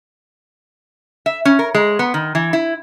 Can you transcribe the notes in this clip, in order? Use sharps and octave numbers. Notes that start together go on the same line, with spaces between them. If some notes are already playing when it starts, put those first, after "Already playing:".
E5
C#4
A#4
G#3
B3
D#3
E3
E4